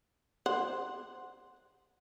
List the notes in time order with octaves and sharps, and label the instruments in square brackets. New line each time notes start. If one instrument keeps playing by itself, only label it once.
[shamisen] C5 F#5